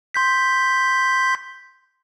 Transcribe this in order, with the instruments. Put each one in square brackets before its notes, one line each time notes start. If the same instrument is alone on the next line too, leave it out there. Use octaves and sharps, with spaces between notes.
[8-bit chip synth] C6 G6 B6